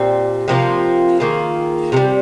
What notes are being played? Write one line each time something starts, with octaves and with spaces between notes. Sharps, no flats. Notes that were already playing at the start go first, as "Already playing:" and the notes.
Already playing: A#2 G3 C4
C3 F3 A#3 F4
D#3 A#3 F4 G#4
C3 D#3 G3